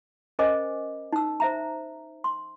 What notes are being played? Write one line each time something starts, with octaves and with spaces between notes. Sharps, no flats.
C#4 A#4 C5 D#5 G#5 D6
D#4 E6
C5 E5 A#5
C6